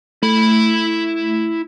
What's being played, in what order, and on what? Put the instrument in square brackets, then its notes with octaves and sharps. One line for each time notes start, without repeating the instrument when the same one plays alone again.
[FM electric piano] A3 [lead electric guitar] E4 B5